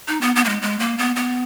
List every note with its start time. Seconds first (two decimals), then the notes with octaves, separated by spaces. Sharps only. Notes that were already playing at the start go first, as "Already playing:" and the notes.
0.08 D#4
0.21 B3
0.36 B3
0.44 A#3
0.49 G#3
0.62 G#3
0.79 A#3
0.98 B3
1.16 B3